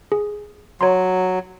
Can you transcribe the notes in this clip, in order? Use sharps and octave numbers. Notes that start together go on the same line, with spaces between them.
G#4
F#3 C#5 A#5 C6